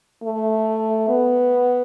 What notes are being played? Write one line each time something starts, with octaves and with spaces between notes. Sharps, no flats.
A3
B3